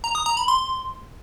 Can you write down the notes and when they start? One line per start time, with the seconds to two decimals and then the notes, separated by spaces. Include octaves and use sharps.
0.04 A#5
0.15 D#6
0.26 A#5
0.37 B5
0.48 C6